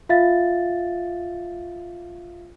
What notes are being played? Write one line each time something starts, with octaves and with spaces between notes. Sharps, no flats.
F4 E5 F5 A6